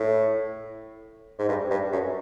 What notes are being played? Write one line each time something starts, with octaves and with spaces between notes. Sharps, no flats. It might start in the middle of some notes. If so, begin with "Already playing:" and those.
Already playing: A2
G#2
G2
G2
F#2